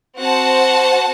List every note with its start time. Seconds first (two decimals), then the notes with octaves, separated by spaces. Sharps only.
0.18 C4 F#4 C5 F#5 A5